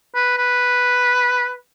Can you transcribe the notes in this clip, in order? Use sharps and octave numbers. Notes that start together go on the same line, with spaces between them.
B4
B4